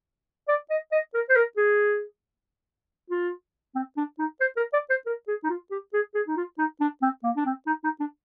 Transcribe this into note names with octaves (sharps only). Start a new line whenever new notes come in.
D5
D#5
D#5
A#4
C5
A#4
G#4
F4
C4
D4
D#4
C5
A#4
D5
C5
A#4
G#4
D#4
F4
G4
G#4
G#4
D#4
F4
D#4
D4
C4
A#3
D4
C4
D#4
D#4
D4